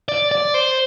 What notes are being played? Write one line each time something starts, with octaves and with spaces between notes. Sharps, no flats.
D5
D5
C5